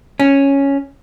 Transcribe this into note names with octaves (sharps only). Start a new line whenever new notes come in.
C#4